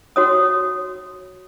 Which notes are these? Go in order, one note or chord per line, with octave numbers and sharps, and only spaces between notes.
F#4 C#5 D#6